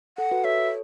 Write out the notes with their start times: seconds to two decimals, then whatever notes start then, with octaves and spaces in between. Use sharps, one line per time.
0.18 A4 F#5
0.31 F#4 B4
0.44 A4 C#5 E5
0.58 A4